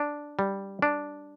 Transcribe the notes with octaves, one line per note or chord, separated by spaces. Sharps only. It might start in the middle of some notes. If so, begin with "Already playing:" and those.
Already playing: D4
G3
D4